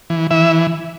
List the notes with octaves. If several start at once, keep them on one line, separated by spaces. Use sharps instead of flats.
E3
E3 E5